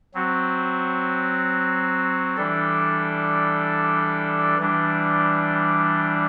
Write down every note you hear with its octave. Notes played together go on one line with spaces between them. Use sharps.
F#3 C4 F#4
E3 G3 D4 A4
E3 G3 D4